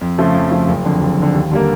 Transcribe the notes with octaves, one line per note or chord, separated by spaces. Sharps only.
F2
C#3 F3 A3
F2
C#3 F3 A3
F#1
F2 D3
F#1
F2 D3
D#2
D3 G3 A#3